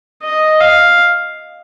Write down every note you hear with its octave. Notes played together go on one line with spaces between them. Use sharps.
D#5
F5